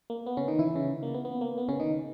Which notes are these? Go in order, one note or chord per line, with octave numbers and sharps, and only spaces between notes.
A#3
B3
C#3 C#4
D#3 D#4
E3 E4
C#3 C#4
A#3
B3
B3
A#3
B3
C#3 C#4
D#3 D#4